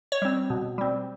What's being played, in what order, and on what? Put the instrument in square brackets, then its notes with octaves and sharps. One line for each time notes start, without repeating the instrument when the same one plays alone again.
[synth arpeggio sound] C#5
G3 C4
B2
G3 C4